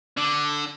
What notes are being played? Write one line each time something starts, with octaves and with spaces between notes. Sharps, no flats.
D3